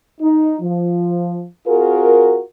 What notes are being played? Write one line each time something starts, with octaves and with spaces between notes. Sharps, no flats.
D#4
F3
C4 F4 F#4 G#4 A#4